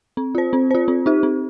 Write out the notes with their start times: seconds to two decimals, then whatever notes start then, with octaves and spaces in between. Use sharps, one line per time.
0.17 C4
0.35 F4 C5
0.53 C4
0.71 F4 C5
0.88 C4
1.06 D#4 G4
1.23 C4